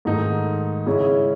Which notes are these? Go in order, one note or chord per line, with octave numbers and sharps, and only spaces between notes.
G#2 D#3 A3 D#4
C#3 G#3 C#4 E4